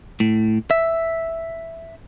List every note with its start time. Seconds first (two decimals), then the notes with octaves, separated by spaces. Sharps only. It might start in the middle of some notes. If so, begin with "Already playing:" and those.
0.20 A2
0.71 E5